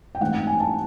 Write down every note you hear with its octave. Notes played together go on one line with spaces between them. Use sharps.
G5
G#2 E3 A3 C4 F#5
G5
G#5
A5